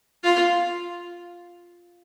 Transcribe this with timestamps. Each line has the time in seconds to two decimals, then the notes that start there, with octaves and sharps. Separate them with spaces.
0.23 F4